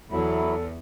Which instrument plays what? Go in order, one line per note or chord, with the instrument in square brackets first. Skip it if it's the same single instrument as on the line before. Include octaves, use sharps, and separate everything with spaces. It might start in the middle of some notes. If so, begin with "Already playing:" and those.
[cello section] E2 [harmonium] F#3 E4 [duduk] A4